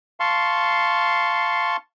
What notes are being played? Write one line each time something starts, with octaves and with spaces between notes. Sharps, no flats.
F5 A5 C6 C#6